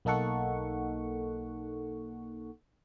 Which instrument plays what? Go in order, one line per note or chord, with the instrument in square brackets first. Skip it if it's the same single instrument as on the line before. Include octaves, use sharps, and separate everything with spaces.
[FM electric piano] B1 A#3 D#4 A4 F#5 C#6